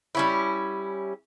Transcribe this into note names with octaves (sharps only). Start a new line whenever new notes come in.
G3 C#4 E4